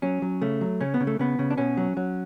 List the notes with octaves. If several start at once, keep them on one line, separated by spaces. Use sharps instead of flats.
F#3 C#4
F#3
C#3 A3
F#3
C#3 C#4
B3
C#3
A3
C#3 B3
C#3
D4
B2 C#4
F#3
F#3